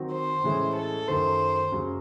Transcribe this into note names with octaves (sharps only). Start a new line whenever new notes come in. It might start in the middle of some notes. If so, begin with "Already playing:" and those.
Already playing: D#3 F#3 C4 F#4
C5
A2 E3 G#3 C#4 E4
A4
F#2 D#3 A3 C5
F#2 C#3 F#3